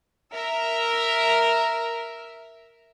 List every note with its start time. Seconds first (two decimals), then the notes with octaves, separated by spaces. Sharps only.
0.33 A#4 E5